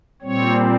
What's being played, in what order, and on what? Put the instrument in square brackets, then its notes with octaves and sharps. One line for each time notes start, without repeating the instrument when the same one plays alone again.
[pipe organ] A#2 G3 C4 C#5